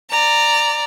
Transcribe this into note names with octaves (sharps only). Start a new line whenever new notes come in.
D5 A#5